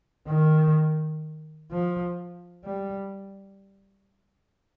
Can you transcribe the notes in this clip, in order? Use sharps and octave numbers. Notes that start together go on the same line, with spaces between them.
D#3
F3
G3